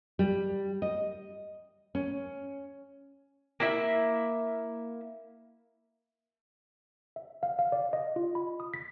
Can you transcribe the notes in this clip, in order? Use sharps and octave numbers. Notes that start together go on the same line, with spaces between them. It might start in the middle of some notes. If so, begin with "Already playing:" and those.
G3
D#5
C#4
A#3 E4 E5
E5
F5
F5
D5
D#5
F4
B5
D#6
B6